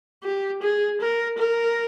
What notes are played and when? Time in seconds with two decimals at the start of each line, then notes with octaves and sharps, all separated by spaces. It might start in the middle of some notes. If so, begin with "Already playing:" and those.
0.24 G4
0.62 G#4
1.00 A#4
1.38 A#4